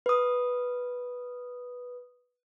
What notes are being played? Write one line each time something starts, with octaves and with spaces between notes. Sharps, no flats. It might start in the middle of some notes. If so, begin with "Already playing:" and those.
B4 D#6